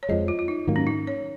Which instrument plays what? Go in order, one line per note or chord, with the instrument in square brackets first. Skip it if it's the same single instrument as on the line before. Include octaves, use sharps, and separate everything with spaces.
[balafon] C#5
[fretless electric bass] F2 F3 G#3 [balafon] D#5
[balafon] F4
F4
D#4
[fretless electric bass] G#2 D#3 F#3 A#3
[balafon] C#4
D#4
C#5